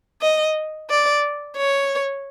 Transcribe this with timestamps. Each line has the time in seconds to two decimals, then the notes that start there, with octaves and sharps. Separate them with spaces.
0.22 D#5
0.90 D5
1.57 C#5